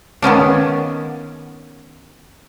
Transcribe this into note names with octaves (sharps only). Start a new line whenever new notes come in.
D#3 B3 C#4 D4